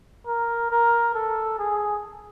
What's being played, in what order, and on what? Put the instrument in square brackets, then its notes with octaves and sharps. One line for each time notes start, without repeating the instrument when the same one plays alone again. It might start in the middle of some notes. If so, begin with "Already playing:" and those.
[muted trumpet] A#4
A#4
A4
G#4